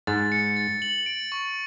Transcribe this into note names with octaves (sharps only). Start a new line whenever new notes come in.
G#2 A6
C#7
A6
F#7
D7
C#6